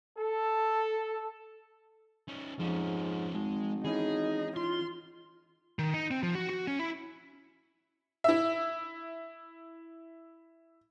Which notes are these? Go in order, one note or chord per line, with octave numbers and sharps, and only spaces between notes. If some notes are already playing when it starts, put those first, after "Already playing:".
A4
C#4 D#4
F2 G#2 F3 C#4
G#1 G#3
E3 C#4 D#4 G#4
F4 C6
D#3
D#4
C4
F3
F#4
F#4
C#4
E4
E4 E5